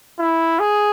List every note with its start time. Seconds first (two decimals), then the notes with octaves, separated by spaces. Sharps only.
0.19 E4
0.59 G#4